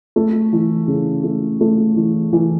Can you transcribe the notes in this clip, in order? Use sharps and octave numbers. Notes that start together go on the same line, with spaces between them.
A3
E3
C#3
A3
A3
E3
E3